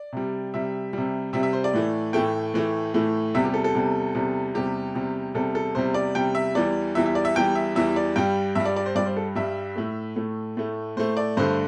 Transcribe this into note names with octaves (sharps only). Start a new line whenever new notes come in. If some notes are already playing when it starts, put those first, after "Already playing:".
Already playing: D5
C3 G3
C3 G3 E5
C3 G3
C3 G3 E5
E5
C5
D5
A2 E3 A3
A2 E3 A3 G5
A2 E3 A3
A2 E3 A3
E2 C3 G3 E5
G4
A4
A4
E2 C3 G3
E2 C3 G3
E2 C3 G3 G4
E2 C3 G3
E2 C3 G3 A4
A4
E2 C3 G3 C5
D5
E2 C3 G3 G5
E5
E2 E3 G3 D5
E2 E3 G3 E5
E5
D5
E5
E2 E3 G3 G5
E5
E2 E3 G3 E5
D5
G2 G3 G5
G2 G3 E5
D5
D5
C5
G2 G3 D5
C5
A4
G2 G3 E5
A2 A3
A2 A3
A2 A3
A2 A3 C5
D5
G2 D3 A3 C5